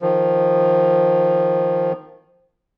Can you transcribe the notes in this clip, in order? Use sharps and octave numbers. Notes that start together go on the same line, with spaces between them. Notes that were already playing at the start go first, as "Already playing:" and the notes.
D#3 F3